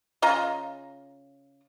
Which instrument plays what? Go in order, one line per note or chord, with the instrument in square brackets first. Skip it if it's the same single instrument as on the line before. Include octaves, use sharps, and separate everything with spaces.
[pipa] C#3 F4 D#5 A#5